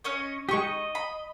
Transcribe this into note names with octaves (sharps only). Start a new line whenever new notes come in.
C#4 C#5 D#5
G#3 D#4 G4 C#6
D#5
B5